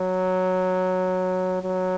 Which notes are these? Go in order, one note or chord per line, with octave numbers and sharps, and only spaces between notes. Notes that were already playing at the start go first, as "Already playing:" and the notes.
Already playing: F#3
F#3